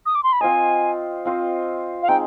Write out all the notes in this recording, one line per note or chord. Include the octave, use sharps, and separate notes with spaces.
D#6
D6
C6
B5
C4 F4 C5 D#5 G#5
C4 F4 C5 D#5
F5
G#3 C4 D#4 G5